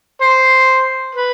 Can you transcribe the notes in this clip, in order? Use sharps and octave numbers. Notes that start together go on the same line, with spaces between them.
C5
B4